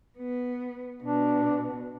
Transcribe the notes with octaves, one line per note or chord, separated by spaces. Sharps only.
B3
B2 D4